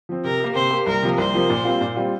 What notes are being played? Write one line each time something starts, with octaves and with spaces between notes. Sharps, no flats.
F3 C4
C3 A#4
A#3 G4
C3 C5
A#3 G4
C2 A#4
C3 F3 A#3
C2 C5
C3 F3 A#3
A#2
G3 C4 F4
A#2
G3 C4 F4